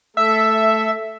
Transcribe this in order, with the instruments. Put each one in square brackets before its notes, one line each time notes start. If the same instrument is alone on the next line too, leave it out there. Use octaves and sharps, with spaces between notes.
[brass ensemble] A3 A4 [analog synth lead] E5